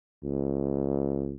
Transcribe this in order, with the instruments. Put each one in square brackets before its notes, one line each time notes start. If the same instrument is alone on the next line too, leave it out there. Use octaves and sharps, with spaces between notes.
[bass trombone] C#2